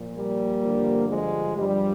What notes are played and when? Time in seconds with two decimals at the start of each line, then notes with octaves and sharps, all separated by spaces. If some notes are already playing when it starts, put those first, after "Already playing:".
Already playing: A#2 F3
0.16 G3 A#3
0.63 G2 D3 F3
1.09 F3 G#3
1.56 G2 F3 G3